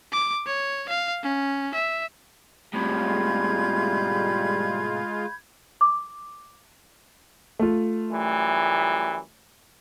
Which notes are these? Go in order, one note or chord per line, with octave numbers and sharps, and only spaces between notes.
D6
C#5
F5
C#4
E5
A2 C3 G3 G#3 F4 B5 G6 G#6
D6
A3 F4
F#2 E3 G3